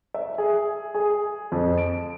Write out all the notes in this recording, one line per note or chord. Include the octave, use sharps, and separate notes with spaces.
E5
G#4
G#4
F2
D7